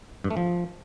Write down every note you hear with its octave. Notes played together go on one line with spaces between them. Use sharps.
G2
A3
F3